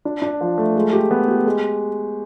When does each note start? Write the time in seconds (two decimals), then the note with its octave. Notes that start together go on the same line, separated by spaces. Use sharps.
0.05 D4
0.22 D4
0.41 F3
0.58 A3
0.76 G#3
0.93 G4
1.11 B3
1.28 G4
1.46 G#3